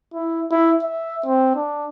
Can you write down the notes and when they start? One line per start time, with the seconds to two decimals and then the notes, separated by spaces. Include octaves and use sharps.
0.14 E4
0.51 E4
0.83 E5
1.26 C4
1.56 D4